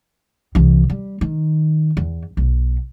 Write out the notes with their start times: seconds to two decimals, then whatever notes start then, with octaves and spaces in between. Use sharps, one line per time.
0.55 C2 E3
0.90 G3
1.21 D#3
1.97 E2
2.37 B1